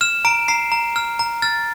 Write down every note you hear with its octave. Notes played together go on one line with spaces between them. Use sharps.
F6 E7
A#5 D7
A#5 C7
A#5
F6
A#5
F6 A6